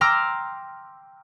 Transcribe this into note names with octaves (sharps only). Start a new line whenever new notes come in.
G5 A#5 C6 D6 E6 F6